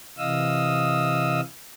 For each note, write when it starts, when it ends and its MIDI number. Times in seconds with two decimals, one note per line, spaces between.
0.18 1.41 48
0.18 1.41 52
0.18 1.41 75
0.18 1.41 77
0.18 1.41 87
0.18 1.41 88